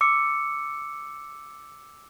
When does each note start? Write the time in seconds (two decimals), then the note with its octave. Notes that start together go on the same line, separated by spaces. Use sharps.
0.01 D6 E6 C#7